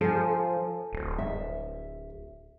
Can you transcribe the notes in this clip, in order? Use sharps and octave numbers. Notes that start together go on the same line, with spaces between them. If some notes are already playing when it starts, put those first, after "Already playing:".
F3 A4 G#5
D1
E5